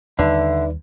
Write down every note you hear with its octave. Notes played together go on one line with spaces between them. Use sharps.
D#2 D3 G3 D#4 B4 D5 E5